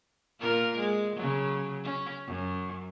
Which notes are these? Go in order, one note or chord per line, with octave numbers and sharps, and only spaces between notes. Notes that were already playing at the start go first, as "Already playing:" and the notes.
A#2 F4 A#4
G#3
C#3 F#3
C#4
F#2